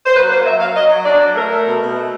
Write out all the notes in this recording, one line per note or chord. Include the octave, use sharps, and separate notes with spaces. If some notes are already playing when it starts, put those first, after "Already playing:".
C5
F#3 B4
A#3 C5
F#3 E5
F#3 F5
F#3 D#5
F#3
D4 D5
F#3
A3 A#4
A3
B2
B2
A3